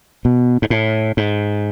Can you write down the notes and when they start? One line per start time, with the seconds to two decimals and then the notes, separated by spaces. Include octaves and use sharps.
0.25 B2
0.62 G#2
0.70 A2
1.17 G#2